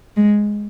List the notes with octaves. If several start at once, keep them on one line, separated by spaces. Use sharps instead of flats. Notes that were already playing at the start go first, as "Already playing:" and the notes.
G#3